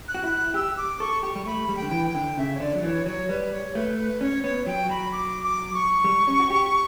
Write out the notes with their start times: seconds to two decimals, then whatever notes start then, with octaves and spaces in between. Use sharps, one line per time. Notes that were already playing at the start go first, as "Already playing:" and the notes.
0.08 F#6
0.14 F#4
0.24 E4
0.31 F#6
0.54 G4 E6
0.77 D6
1.00 A4 C#6
1.23 G4 C#6
1.35 G3
1.46 A3 B5
1.69 G3
1.76 G5
1.82 D3
1.91 E3
2.07 G5
2.15 D3
2.37 C#3 E5
2.55 C#5
2.60 D3 D5
2.75 F#3
2.83 E3 C#5
3.06 F#3 C#5
3.29 G3 B4
3.52 C#5
3.75 A3 B4
3.98 B4
4.21 C#4 C#5
4.44 B3 C#5
4.66 F#3 G5
4.89 F#3 B5
5.12 D6
5.44 D6
5.74 C#6
6.04 G3
6.27 C#4
6.39 F#4
6.50 G4